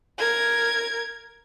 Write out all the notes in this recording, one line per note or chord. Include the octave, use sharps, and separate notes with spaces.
A#4 G#6